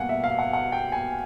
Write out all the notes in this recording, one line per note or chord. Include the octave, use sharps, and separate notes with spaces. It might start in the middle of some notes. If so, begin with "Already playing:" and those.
Already playing: B2 G3 A#3 F5 F#5 G#5
E5
F5
F#5
F#5
G5
G#5